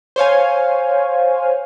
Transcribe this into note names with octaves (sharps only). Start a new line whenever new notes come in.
C5 C#5 F5 G#5